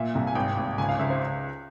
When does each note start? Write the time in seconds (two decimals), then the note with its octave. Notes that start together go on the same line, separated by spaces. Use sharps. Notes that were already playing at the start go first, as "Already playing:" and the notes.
Already playing: A#2 E5
0.15 C2
0.27 G#5
0.35 G#1 G5
0.57 G#1
0.78 C#2 G#5
0.89 F5
0.99 C#2 E5
1.10 C5